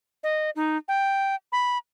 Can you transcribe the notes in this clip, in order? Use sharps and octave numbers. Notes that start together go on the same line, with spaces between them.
D#5
D#4
G5
B5